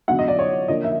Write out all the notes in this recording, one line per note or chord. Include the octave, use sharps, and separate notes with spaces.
D3 F#3 B3 F#5
D#5
D5
C#5
D3 F3 A#3 D#5
E5